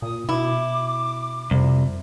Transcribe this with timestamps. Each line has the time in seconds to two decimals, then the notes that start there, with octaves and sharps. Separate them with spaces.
0.02 A#2 D#6
0.29 B2 E4 D6
1.51 C2 F2